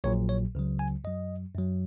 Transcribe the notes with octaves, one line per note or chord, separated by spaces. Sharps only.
A#1 A#2 F#3 C#5
C#5
C#2 C#3 F#3
G#5
F#2 F#3 D#5
F#2 F#3